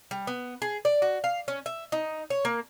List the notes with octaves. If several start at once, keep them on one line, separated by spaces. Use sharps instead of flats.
G3
B3
G#4
D5
F#4
F5
C#4
E5
D#4
C#5
A#3